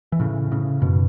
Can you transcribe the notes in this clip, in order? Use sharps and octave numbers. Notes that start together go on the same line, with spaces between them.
E3
A2 C#3
A2 C#3
F#2 B2